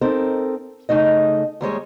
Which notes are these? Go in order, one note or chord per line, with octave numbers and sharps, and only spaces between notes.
C4 D#4 A4 A#4
C#3 A3 D#4 D#5
D#2 G3 G#3 C#5